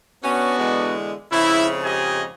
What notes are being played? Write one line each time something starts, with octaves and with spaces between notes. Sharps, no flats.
B3 C#4 D4 F#4
E2 D3 G#3
F2 G#2 C#3 E4
G4 D#5 G#5